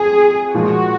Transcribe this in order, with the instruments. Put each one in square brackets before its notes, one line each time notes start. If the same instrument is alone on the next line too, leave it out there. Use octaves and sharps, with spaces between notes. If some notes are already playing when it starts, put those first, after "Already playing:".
Already playing: [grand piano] F2 [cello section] G#4
[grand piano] A#2 F3 G#3 [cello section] F#4